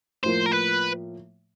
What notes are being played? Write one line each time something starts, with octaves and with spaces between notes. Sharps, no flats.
A2 F3 A#3 C5
A#4
B4